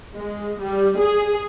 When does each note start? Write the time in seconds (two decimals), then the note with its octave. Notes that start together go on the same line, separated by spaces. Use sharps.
0.16 G#3
0.61 G3
0.99 G#4